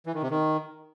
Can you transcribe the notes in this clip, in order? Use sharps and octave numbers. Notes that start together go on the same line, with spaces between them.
E3
D#3
C3
D#3